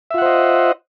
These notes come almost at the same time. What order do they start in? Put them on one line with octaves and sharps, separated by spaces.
E5 F4 F#5 C5 D#5